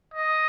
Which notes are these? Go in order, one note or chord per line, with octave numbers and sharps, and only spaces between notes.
D#5